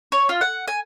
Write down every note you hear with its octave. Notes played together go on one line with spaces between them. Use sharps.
C#5
F4
F#5
G#5